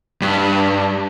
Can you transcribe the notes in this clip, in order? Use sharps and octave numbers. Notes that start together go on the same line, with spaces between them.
G2